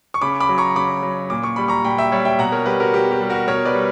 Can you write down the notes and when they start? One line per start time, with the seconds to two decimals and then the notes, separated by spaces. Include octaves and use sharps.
0.14 C#6
0.21 C#3 B5 D6
0.40 B5 D6
0.49 F#3
0.58 A#5 C#6
0.76 C#3 B5 D6
1.03 F#3
1.30 A#2 D6
1.43 C#6
1.56 G3 B5
1.68 A#5 C#6
1.85 A#2 G5 B5
1.98 E5 G5
2.12 G3 C#5 E5
2.25 E5 G5
2.39 B2 F#5 A#5
2.52 A#4 C#5
2.66 G3 G4 B4
2.80 F#4 A#4
2.93 B2 G4
3.11 G4
3.20 G3
3.30 F#4 A#4
3.48 B2 A#4 C#5
3.65 B4 D5
3.75 G3